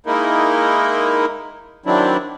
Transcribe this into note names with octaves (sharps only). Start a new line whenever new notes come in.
G#3 A#3 D#4 E4 A#4
D#3 F#3 C4 D4 E4